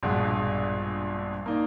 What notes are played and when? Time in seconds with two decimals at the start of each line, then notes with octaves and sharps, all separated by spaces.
0.03 A#1 G2 B2 G#3
1.46 A#3 D#4 D5